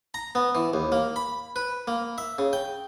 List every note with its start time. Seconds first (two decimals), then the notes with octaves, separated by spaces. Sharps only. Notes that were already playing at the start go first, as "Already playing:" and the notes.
0.14 A#5
0.35 B3
0.55 E3
0.74 D#2
0.92 A#3
1.16 B5
1.56 B4
1.88 A#3
2.18 E5
2.39 C#3
2.53 G5